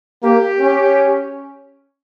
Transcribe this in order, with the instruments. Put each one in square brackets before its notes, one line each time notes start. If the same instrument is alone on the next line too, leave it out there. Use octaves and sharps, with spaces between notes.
[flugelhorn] A#3 [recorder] G4
[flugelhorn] C#4